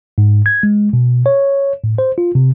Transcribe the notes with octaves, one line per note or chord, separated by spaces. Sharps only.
G#2
G#6
G#3
B2
C#5
A2
C5
F4
C3